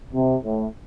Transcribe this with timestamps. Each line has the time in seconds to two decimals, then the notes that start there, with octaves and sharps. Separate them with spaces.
0.13 C3
0.44 A2